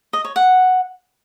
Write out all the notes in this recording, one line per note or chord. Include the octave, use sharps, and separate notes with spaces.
D#5
C#5
F#5